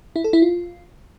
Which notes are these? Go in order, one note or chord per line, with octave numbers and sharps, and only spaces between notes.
E4
A4
E4
F4